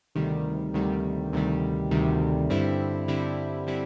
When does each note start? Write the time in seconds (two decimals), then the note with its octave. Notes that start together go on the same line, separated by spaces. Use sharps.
0.15 D2 C3 D#3 G3
0.73 D2 C3 D#3 G3
1.33 D2 C3 D#3 G3
1.91 D2 C3 D#3 G3
2.50 G2 D3 G3 C4 E4
3.08 G2 D3 G3 C4 E4
3.67 D3 G3 C4 E4